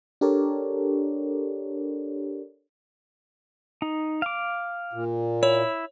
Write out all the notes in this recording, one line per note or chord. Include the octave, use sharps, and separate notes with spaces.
D4 G4 A4 A#4 C#5 D5
D#4
F5 D6
A#2
E4 C#5